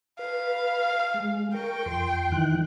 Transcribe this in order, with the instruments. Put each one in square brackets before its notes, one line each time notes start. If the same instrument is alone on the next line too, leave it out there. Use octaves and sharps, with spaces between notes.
[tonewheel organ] B4 [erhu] F5
[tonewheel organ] G#3
[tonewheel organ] A#4 C#6 [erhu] G5
[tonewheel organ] F2 C6
D#3 E3 F#6